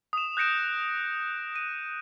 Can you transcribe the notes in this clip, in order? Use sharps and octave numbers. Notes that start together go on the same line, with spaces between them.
D#6 E7
F#6 G6 A#6 C#7 D7 E7
D#7